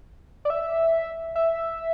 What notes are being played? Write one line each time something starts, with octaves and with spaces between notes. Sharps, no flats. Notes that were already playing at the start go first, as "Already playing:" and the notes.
D5
E5
E5